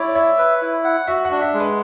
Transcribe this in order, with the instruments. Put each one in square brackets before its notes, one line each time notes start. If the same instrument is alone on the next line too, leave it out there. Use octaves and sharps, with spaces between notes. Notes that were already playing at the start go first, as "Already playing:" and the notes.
Already playing: [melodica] E4 [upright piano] C#5 D5
[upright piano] C#5 [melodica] E5
[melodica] B4
E4
F#5
[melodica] F#4 [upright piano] E5
[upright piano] F#5
[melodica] D4
[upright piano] E5
[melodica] G#3
[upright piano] B4